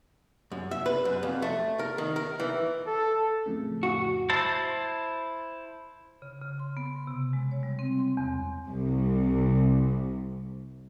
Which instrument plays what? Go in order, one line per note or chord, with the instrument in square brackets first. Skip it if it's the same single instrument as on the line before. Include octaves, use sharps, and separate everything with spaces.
[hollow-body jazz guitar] F#2
E5
B4
F#2
F2
A3
A#4
D#3
A#4
E3
[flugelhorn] A4
[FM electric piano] F2 A2 C#3
[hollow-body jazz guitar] F#4
[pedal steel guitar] E4 C5 A5
[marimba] C#3
C#3
C6
B3
C3
G#3
C#5
G3
C4
C6
E2
[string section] C2 C3